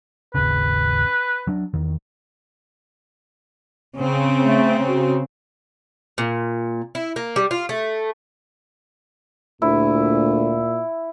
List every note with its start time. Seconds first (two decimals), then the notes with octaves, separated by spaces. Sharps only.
0.35 G#1 D#2 C#3 B4
1.47 F#3 D4
1.74 E2 D#3
3.98 C#3 C4
4.43 A3
4.87 F#4
6.18 A#2
6.95 E4
7.16 A#3
7.36 G3
7.51 F4
7.69 A3
9.62 D2 A#2 E4